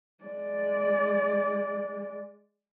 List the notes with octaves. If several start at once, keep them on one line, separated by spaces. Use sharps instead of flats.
G#3 D5